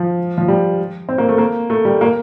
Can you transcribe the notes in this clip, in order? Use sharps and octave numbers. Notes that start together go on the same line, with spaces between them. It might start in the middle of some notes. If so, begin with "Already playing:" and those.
Already playing: F3
F3
G3
C4
A#3
A3
A#3
A3
G3
A#3